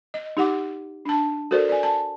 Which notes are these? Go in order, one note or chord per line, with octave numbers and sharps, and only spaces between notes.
D#5
D#4 G4 F#5 D6
D4 A5
F#4 A4 A#4 C5 D5
D5 G#5
A5